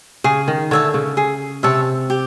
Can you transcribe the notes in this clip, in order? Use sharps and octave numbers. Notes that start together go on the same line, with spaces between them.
C#3 G#4
D#3
D3 C#5 E5 A5
C#3
G#4
C3 C#5 E5 A5
G4